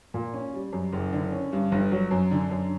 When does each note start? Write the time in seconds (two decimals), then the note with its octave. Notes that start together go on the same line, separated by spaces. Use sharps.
0.14 A#2
0.34 C#4
0.53 G3
0.73 F#2
0.93 F#1
1.12 D3
1.32 C#4
1.53 G2
1.72 G1
1.92 F#3
2.11 F#2
2.31 D3
2.51 F#2